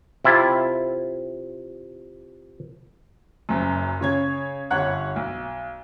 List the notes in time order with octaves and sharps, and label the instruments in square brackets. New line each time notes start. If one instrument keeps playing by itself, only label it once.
[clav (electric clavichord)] C3 E4 F4
[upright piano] F#1 F#2
C#3 C#5 G#6
G1 G2 C#5 F#5 F#6
B1